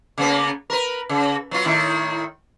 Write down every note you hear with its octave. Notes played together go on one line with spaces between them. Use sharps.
C#3 A#3 B3
A#4 B4
C#3
F#3 B3 F4
A2 D#3 E4